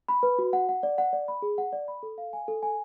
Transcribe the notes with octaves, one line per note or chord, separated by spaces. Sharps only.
B5
B4
F#4
F#5
F#5
D5
F#5
D5
B5
G#4
F#5
D5
B5
A4
F5
G#5
A4
G#5